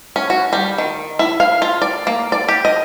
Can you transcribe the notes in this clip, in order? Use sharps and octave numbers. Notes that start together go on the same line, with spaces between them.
C#4
F#4
G3
D#3
E4
F5
F4
D5
A#3
D5
G4
D#5